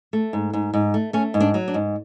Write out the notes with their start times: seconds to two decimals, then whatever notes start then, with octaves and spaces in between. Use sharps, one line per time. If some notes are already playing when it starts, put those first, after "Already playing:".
0.13 A3
0.33 G#2
0.53 G#2
0.74 G#2
0.94 A3
1.13 A3 C#4
1.34 G#2
1.40 D4
1.54 F#3
1.68 D4
1.74 G#2